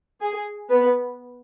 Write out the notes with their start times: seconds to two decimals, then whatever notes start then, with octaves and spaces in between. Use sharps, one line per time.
0.21 G#4
0.70 B3 B4